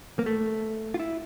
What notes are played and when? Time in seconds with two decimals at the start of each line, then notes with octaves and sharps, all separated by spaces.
0.19 A#3
0.26 A3
0.94 F4
0.99 E4